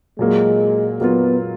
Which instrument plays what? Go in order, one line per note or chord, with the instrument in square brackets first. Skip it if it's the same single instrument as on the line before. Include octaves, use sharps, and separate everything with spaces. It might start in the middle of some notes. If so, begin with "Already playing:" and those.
[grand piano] A#2 F#3 A#3 F4 [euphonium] G#3
[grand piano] A#2 F#3 A#3 F4 [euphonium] B3